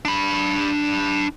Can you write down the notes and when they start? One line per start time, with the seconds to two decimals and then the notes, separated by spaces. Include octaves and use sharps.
0.05 D4 B5